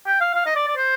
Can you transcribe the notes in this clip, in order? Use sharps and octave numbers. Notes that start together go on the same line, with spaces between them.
G5
F5
F5
D#5
D5
D5
C5